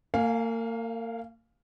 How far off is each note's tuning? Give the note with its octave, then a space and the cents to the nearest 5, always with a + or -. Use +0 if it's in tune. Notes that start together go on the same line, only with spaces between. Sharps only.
A#3 -35 F5 +10 G#5 +0